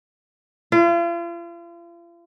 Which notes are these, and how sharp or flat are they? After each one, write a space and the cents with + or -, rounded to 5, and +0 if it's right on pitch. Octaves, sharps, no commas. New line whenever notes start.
F4 -40